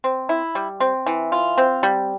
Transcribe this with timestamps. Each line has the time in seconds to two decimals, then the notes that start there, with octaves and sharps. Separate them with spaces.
0.04 C4
0.29 E4
0.55 G3
0.80 C4
1.06 E3
1.32 F4
1.58 C4
1.83 G3